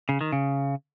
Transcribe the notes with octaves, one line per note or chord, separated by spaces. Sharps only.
C#3
D#3
C#3